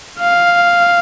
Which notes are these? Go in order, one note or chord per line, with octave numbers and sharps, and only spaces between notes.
F5